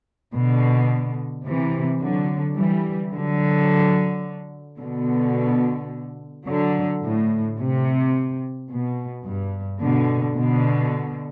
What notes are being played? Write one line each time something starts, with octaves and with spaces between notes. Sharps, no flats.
B2 D3
C3 E3
D3 F#3
E3 G3
D3 F#3
B2 D3
D3 F#3
A2
C3
B2
G2
B2 D3
B2 D3